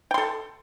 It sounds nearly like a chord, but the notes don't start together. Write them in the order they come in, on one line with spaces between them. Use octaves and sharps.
G5 C6 A4